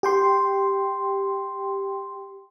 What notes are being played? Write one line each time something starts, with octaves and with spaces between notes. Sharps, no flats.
G4 G5 C6